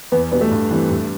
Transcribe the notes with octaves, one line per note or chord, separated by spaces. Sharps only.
E2 B3
B2 G3 B3 D4
A3
G2
E3 G3 C4
G2